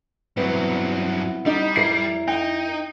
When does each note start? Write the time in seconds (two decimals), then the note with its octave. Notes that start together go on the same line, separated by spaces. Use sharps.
0.37 G2 F#3 B3 C4 E4
1.46 G3 D#4
1.76 F2 E4 A#4 C7
2.28 D#4 G5